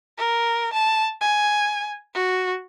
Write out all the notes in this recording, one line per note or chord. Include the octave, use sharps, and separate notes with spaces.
A#4
A5
G#5
F#4